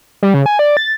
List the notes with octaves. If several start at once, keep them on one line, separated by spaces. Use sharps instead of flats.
G3
C#3
G#5
D5
A6